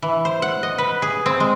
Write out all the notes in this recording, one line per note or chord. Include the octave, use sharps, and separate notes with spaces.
E3
C5
F#5
D#5
B4
G#4
C4
G#3